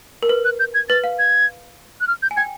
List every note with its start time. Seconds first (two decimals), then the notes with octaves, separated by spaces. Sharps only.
0.23 A#4
0.29 B4
0.45 F#6
0.60 G6
0.74 G#6
0.89 B4 A6
1.04 F5
1.19 G#6
2.01 F#6
2.08 F6
2.22 G6
2.31 G#5
2.37 G5 G#6